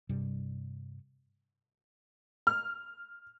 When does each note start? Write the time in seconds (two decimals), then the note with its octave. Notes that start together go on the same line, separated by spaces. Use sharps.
0.09 G2 C3 G3
2.47 F6